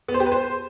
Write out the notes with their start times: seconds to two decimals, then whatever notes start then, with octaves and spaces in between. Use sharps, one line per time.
0.08 B3
0.14 C5
0.20 G4
0.26 B4
0.32 C5